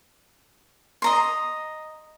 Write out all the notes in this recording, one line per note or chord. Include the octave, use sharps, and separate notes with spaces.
D#5 A#5 C6